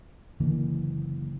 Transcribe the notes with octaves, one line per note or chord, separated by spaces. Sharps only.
F#1 D3 E3 A#3